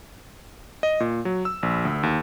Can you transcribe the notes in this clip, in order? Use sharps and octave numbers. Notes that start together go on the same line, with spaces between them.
D#5
A#2
F#3
E6
A#1
D2
D#2